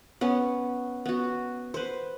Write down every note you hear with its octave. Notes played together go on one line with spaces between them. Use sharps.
B3 C#4
B3 F#4
B4 C5